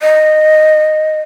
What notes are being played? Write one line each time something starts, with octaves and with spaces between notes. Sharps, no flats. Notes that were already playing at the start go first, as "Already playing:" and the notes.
D#5